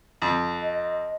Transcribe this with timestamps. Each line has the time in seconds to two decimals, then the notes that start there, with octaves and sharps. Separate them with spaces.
0.22 F2
0.63 D#5